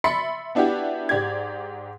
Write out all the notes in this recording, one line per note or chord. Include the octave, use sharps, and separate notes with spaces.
E5 B5 C6 A6 B6 C#7
B3 D4 E4 F#4 G4
G#2 G4 D5 G#6